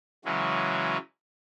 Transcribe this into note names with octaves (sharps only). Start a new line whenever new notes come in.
C#3 E3 F#3 G#3 C#4